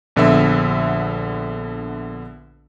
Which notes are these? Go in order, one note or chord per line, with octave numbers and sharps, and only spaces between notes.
A#1 D3 B3 E5 E6